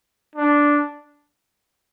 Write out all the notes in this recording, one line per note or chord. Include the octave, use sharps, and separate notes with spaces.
D4